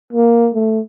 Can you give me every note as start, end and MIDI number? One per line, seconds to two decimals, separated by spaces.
0.13 0.50 58
0.55 0.80 57